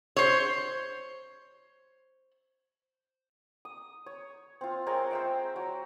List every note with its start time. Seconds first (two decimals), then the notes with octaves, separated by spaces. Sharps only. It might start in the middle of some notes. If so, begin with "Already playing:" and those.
0.16 C5 C#5
3.65 D#6
4.06 C#5
4.61 C4 F4
4.86 G#3 C4 A#4 C#5
5.11 C5 E5 G5
5.56 F#3